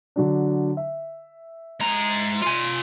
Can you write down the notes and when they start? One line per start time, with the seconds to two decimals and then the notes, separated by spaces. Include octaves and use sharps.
0.16 D3 F#3 D4
0.77 E5
1.80 G#3 A#5
2.42 F4 G#5